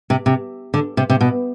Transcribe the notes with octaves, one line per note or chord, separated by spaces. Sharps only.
C3
C3
D3
C3
C3
B2